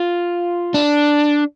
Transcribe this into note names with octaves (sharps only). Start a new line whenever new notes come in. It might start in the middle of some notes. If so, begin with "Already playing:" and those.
Already playing: F4
D4